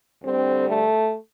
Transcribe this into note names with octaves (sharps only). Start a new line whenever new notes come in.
D2 D3 G3 C4
A3